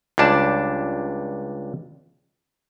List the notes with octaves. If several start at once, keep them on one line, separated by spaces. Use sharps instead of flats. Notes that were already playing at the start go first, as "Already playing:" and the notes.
C#2 G3 D4 A5